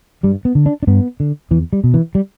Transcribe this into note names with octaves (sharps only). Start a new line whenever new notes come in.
G2 G3
B3
D3
D4
D4
G2 B3
D3
E2 E3
G3
B2
E3
G3